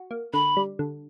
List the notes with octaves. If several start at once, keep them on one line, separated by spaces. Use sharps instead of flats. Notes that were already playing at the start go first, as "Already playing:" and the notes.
Already playing: F#4
A#3
D3 B5
G3
D3